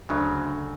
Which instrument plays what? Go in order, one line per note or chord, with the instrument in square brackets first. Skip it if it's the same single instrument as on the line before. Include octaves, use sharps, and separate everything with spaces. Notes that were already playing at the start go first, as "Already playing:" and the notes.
[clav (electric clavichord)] D2 C#3 F#3 [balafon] D4